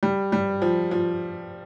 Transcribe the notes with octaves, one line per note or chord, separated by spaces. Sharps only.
G3
G3
F3
F3